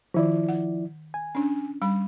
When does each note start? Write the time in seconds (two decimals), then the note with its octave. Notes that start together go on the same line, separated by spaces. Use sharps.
0.14 D#3 F3 E4 D5
0.49 F#5
1.14 G#5
1.35 C#4 D4
1.82 G3 B5